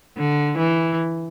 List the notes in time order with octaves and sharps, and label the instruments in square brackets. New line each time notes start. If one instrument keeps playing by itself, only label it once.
[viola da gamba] D3
E3